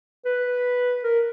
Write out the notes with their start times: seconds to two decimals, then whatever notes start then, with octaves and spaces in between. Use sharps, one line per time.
0.25 B4
1.04 A#4